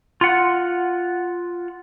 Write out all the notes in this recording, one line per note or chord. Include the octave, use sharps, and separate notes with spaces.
F4 F#5